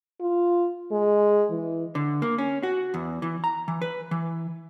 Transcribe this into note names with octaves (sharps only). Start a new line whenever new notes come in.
F4
G#3
E3
D3
A#3
C#4
F#4
E2
E3
A#5
E3
B4
E3